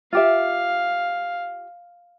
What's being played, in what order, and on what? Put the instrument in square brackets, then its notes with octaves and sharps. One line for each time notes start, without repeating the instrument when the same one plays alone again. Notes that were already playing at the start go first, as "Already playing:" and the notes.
[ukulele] F4 G4 E5 [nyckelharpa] F5